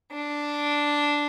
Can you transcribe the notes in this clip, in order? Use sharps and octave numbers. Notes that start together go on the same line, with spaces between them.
D4